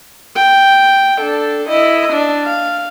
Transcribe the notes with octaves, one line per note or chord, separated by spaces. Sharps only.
G5
D4 A4
E4 D#5
D4
F5